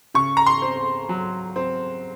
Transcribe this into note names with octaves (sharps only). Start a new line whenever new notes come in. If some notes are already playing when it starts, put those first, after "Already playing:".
C#3 C#6
A#5
C6
C4
F#3
C4